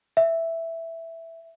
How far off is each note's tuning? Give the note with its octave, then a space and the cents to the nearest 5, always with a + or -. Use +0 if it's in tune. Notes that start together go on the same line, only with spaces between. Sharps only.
E5 +0